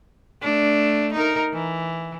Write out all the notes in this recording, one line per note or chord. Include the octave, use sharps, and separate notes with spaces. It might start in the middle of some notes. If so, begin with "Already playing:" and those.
A3 D4
D#4 A#4
E3